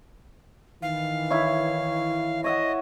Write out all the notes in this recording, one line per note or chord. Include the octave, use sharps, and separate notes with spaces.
D#3 E3 F5
E4 C#5
C#5 D#5 E5 F#5